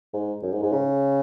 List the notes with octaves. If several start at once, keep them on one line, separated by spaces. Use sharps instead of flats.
G#2
F#2
G#2
G#2
C#3